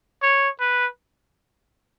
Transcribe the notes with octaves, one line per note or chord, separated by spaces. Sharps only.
C#5
B4